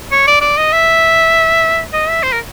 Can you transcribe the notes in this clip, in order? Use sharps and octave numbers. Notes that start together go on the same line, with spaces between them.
C#5
D5
D5
D#5
E5
D#5
E5
C5
A#4